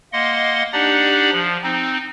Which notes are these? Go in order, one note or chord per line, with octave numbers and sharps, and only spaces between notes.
A#3 D#5 F#5 C6
D4 D#4 G4 D5 F#5
F3
C4 D#4